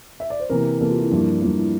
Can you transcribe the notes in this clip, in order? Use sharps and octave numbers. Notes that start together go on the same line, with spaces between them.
E5
D5
C5
C3 E3 A#3 A#4
C3 E3 A#3 A4
F4
E4
G2 F3 A#3 E4
G2 F3 A#3
E4